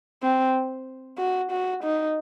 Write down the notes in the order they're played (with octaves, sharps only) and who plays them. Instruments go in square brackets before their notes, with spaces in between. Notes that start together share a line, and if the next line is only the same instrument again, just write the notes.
[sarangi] C4
F#4
F#4
D#4